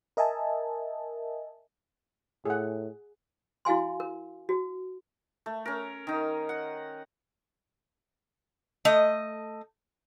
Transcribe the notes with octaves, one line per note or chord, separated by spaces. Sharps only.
A#4 D#5 E5 G#5 A5
A2 G#4 F#5
E4 F#4 F5 G#5 C6
A#4
F#4
A3
C#4 A#4
D#3 D#4
F#5
A3 D#5